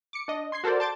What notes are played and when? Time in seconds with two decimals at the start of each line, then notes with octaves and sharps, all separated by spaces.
0.13 D6 C#7
0.28 D4 D#5
0.52 C6 G#6 C7
0.64 F#4 A4 A#4 C5 D5
0.80 A5 C6 D6 G6 A6